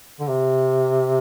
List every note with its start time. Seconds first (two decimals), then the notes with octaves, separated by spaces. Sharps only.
0.20 D3
0.28 C3